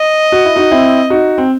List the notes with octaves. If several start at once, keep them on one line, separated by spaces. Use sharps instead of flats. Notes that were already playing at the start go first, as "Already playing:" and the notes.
Already playing: D#5
F#4
E4
D#4 F#4
C4 E4
D#4 F#4
C4